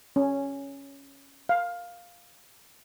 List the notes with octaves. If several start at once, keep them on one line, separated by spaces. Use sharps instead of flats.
C#4
F5